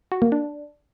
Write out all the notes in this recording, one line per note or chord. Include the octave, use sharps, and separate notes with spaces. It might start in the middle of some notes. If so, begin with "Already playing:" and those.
F#4
A#3
D4